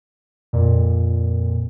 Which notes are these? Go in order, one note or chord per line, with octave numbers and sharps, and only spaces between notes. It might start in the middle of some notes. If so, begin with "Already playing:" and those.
F2 A#2